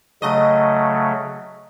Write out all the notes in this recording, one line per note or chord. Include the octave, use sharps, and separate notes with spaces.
C#3 F#3 A3 D#5